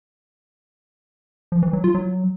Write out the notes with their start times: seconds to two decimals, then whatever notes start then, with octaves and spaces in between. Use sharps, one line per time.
1.52 F3
1.63 E3
1.73 F#3
1.84 F4
1.95 F#3